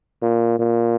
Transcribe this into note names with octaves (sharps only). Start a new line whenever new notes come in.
A#2
A#2